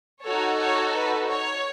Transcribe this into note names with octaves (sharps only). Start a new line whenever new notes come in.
D#4 F#4 A4 C#5
C#5
B4
C#5